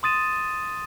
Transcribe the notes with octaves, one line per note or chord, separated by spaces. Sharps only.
C6 D#6 A6 D#7 E7